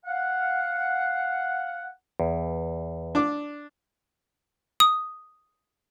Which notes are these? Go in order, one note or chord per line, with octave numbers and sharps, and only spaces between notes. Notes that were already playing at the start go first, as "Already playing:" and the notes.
F5 F#5
E2
D4 D6
D#6